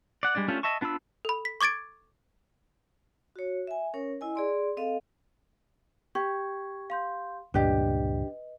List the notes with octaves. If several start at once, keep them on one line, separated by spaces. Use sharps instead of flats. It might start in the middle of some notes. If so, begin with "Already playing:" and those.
D5 F#5
G3 G#3 D4 D5
A3 C#4 D4 F4 G4
D#5 E5 A5 C#6
B3 D4 F4 B5 E6
A4 B5
B6
C#6 D6 G#6 A6 D7
F#4 C#5
E5 G#5
C#4 A#4 C#5
E4 D#5 G#5
G#4 D5 C6
C4 A4 D#5 F5
G4 C#6 G#6
F5 C6 G6
C#2 G2 A#2 D4 G4 B4 D#5